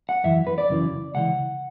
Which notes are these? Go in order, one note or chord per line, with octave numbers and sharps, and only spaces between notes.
F#5
F#2 E3 E5
B4
D5
F#2 C#3 E3
C#2 C#3 E3 F#5